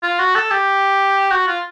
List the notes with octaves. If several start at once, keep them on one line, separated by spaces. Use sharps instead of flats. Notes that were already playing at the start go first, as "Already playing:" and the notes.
F4
F#4
A4
G4
F#4
F4